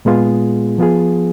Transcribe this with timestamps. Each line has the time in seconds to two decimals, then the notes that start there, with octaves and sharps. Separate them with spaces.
0.05 A#2 G#3 B3 F4 G#4
0.78 F3 B3 F4 G#4